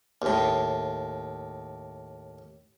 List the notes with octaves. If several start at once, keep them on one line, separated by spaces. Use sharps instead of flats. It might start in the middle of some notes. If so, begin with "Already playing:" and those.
D#2 A2